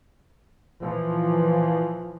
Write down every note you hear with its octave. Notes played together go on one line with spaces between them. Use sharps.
A#2 E3 F3